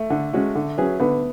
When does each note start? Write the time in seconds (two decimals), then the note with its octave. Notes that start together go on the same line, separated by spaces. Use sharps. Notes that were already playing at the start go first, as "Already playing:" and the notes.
Already playing: A3
0.10 D3
0.33 G#3 C#4 F#4
0.55 D3
0.78 F#3 C#4 G#4 B4
1.00 D3 B3